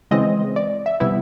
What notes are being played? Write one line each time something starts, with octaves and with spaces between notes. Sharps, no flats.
C#3 E3 G#3 C4 D#5
D5
E5
C3 E3 G3 B3 E4 E5